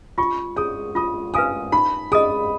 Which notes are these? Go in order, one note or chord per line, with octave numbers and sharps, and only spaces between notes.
F4 C#6
G#4 C#5 D#6
F4 D#6
B4 F5 G#5 D#6
D#4 B5
G#4 D#5 D#6